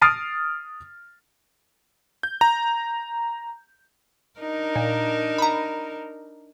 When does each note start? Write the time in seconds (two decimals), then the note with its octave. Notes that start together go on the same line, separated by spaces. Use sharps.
0.01 D#6 F6 A6 C7 D7 D#7
2.23 G6
2.41 A#5
4.40 D4 D#4 A#4
4.76 A#2
5.38 A#5 B5